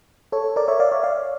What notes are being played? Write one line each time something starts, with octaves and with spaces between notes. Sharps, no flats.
A4 C#5
A#4 D5
C#5 E5
D5 F5
C#5 E5
D5 F5